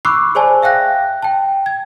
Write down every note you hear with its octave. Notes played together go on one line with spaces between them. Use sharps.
B5 C#6 D6 E6 F#6 C7
G#4 C5 D5 G#5 A5
E5 F5 G5 F#6 A#6
G5 A5
G#6